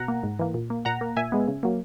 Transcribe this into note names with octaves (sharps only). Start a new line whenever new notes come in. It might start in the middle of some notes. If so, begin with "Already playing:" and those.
Already playing: B2 F#5 A#5
A#3
G#2
E3 A#3
A#2
A#3
A#2 F#5 A#5
A#3
A#2 E5 G#5
G#3 B3
C#3
F#3 A#3